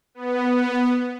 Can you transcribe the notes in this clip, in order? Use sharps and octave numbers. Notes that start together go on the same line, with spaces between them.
B3